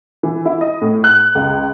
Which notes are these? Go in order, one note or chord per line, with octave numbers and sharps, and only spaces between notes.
E3
E4
D#5
A2
F#6
C#2